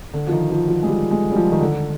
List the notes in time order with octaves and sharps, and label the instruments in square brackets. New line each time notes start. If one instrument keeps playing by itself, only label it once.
[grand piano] D3
F3
D#3
F3
F3
G#3
G3
G#3
G3
F3
D#3
D3